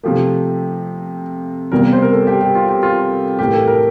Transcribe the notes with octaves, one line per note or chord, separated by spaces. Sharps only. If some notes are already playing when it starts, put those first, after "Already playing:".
C3 F3 A3 G4
E2 C3 G3 A#3 A#4
A#4
C5
A#4
A4
G4
G4
F4
G4
F4
A2 E3 A#3 G4
A4
A#4